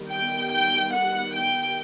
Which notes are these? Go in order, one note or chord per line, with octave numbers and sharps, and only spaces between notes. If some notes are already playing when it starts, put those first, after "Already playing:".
Already playing: D#3 G3 B3
G5
G5
F#5
G5